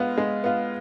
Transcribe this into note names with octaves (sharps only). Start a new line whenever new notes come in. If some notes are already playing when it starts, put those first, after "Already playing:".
Already playing: G#3 B3 F4
G#3
B3 F4